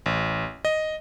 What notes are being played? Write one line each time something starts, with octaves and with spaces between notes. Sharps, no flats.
A1
D#5